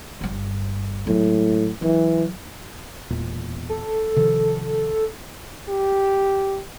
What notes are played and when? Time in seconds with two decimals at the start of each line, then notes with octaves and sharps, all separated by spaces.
0.21 G1 G2
1.07 A2 F#3 G#3
1.82 E3 F#3
3.10 E1 E2 A#2
3.69 A4
4.16 C3 D#3 F3
5.69 G4